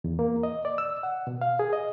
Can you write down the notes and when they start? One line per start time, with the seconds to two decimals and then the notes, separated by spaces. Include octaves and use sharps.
0.04 E2
0.19 A#3
0.43 D#5
0.65 D5
0.78 E6
1.03 F#5
1.27 B2
1.41 F5
1.59 G#4
1.73 D#5